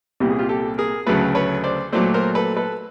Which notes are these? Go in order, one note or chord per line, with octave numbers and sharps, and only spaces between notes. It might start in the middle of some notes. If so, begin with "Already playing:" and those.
C2 A#2 G3 G4
G#4
F4 G4
G4 A4
G#4 A#4
D2 C#3 F#3 A3 A4 B4
B4 C#5
C5 D5
A#2 F#3 A3 C5 D5
A#4 C5
A4 B4
A4 B4